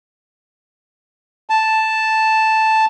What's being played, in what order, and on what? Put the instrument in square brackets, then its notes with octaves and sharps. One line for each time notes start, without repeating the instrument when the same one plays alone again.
[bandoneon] A5